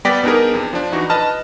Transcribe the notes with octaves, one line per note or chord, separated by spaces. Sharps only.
G3 B3 D5 G5 A#6 B6
B3 D4 D#4 G4 G#4 A#4
F2
F3 D4
E3 D#4 F#4
B4 D#5 A5 F6